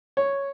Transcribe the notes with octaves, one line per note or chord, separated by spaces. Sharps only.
C#5